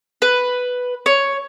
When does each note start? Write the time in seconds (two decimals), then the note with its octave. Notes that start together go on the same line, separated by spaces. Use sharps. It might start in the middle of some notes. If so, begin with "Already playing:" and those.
0.22 B4
1.06 C#5